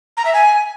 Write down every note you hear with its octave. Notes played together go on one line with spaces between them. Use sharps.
A#5
E5
G#5